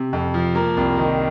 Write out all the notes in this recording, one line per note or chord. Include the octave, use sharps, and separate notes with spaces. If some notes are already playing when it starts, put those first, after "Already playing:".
Already playing: C3
F2
F3
A#3
C2
D#3